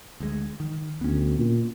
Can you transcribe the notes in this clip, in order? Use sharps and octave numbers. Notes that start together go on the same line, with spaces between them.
D2 G#3
D#3
D2 B3 C#4
A#2